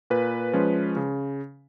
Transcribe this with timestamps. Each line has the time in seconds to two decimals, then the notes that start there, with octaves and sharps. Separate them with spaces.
0.10 A#2 B4
0.53 F3 G#3 C#4
0.96 C#3